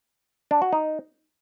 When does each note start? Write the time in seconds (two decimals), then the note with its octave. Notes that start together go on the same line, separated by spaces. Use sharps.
0.51 D4
0.62 F#4
0.73 D#4